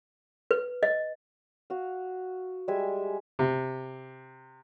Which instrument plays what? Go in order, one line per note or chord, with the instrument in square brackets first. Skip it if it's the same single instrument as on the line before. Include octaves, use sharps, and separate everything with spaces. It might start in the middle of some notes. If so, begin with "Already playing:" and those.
[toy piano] B4
D#5
[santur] F#4 F5
G3 G#3 E5 G#5
[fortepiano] C3